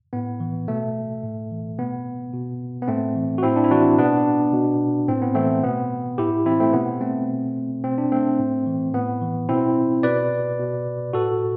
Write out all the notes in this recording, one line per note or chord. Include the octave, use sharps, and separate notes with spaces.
A2 B3
E3
B2 A3
A2
E3
B2 B3
B2
B3
A2 A3 C4
E3
F#4
A2 C4 E4
D4
E4
E3 D4 F#4
B2 B3 D4
B2
A2 C4
B3
E3 A3 C4
B2 B3
A2 E4 G4
E3 C4 E4
A3 C4
B2 B3
A3 C4
B2
B2 C4
D4
A3 C4
A2
E3
A2 B3
E3
B2 C4 E4
B2 B4 D5
B2
A2 F#4 A4